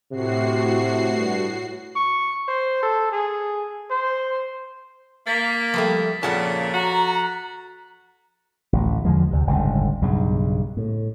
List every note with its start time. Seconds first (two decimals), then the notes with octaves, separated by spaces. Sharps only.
0.11 A2 C3 F#4 C7
1.16 G2
1.96 C#6
2.48 C5
2.83 A4
3.12 G#4
3.91 C5
5.27 A#3 A6 B6
5.74 F3 G3 A3
6.23 F2 A#2 C#3 F#5 A5
6.74 F#4 A#5
8.73 A1 D2 A2
9.05 E2 D3 F3 G#3
9.31 D2 C3
9.47 G1 C#2 A2 D3
10.02 B1 G2 C#3
10.77 A2